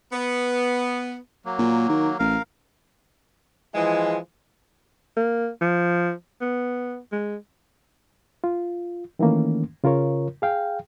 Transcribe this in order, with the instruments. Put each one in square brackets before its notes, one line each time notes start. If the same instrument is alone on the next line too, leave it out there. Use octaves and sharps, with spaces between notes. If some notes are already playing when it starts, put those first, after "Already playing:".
[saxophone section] B3
[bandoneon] F#3 A#3
[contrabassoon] A#2
D#3
[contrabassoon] A1 [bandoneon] A#4 F5
[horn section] E3 F3 G#3
[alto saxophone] A#3
F3
B3
G#3
[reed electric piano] F4
D#3 E3 A3 A#3 C#4
C#3 F4 A#4 C#5
G#4 F5 G5